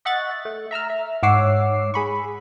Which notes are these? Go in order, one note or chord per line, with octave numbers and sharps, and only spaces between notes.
D#5 E5 F#5 C#6 F#6 A6
A3
E5 A#5 E6 F6
E5
G#2 C#5 F#5 D6 E6 C7
G#4 B5 C#6